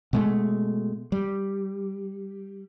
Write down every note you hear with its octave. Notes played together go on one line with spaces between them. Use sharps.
B2 G#3 A3
G3